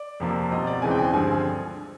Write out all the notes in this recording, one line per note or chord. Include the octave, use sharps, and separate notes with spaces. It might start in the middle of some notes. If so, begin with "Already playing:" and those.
Already playing: D5
F2 C3 F3 A#3
B2 G3 C4 D#5
D5
E2 C#3 E3 G#3 C4 G#5
G5
G#5
G2 D3 F3 G#3 C4 G#5